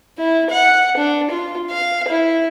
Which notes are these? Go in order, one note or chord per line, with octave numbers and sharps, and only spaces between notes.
E4
F#5
D4
F4
F5
E4